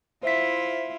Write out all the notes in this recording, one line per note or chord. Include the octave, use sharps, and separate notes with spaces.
E4 F4 C5 E5 B6